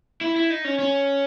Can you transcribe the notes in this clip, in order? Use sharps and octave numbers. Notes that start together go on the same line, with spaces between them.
E4
E4
D#4
C#4
C#4